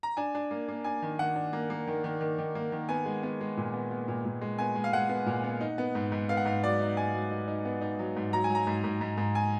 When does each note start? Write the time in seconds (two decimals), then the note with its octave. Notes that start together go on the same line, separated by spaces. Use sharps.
0.03 A#5
0.17 D4 G#5
0.35 D4
0.51 A#3
0.69 A#3
0.84 D4 G#5
1.02 D#3
1.19 D#3 F#5
1.36 D4
1.53 A#3
1.70 A#3
1.88 D#3
2.04 D#3
2.21 D#3
2.38 D#3
2.55 A#3
2.72 D#3
2.89 B3 G#5
3.05 G#3
3.23 B3
3.41 G#3
3.57 A#2
3.74 B3
3.91 B3
4.08 A#2
4.25 A#2
4.41 G#3
4.59 B3 G#5
4.76 G#3
4.84 F5
4.93 G#3 F#5
5.09 B3
5.26 A#2
5.44 B3
5.61 D#4
5.78 B3
5.95 G#2
6.12 G#2
6.29 B3 F5
6.37 F#5
6.45 G#2 F5
6.63 F#3 D5
6.81 D#4
6.96 G#2 G#5
7.14 F#3
7.31 D#4
7.48 D#4
7.65 B3
7.81 D#4
7.99 F#3
8.16 G#2
8.32 F#3 A#5
8.44 G#5
8.50 F#3
8.55 A#5
8.67 G#2
8.84 G#2
9.01 G#2
9.17 G#2
9.35 G#5